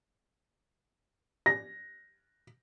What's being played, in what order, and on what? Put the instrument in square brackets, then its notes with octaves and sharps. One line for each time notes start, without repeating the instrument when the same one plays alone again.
[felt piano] A#6